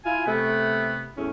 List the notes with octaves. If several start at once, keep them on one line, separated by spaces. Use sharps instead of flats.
E4 F4 G#5
C3 A3 B3
E2 A2 C#4